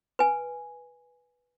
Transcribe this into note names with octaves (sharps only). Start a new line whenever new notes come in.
B4 G#5